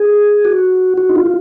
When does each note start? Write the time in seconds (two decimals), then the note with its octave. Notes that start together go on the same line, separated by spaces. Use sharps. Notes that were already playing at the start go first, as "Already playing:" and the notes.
Already playing: G#4
0.45 F#4
0.98 F#4
1.09 D#4
1.16 F4
1.26 F4